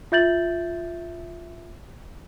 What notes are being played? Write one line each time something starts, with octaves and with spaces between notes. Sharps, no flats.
F4 E5 G6 A6 F#7